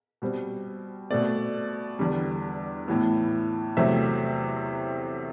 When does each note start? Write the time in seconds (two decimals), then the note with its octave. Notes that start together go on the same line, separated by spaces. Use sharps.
0.22 B2 G3 C4
1.10 B2 A3 C4 D5
1.99 E2 D3 G3
2.88 A2 E3 B3
3.77 E2 C3 F#3 A3 C4 E5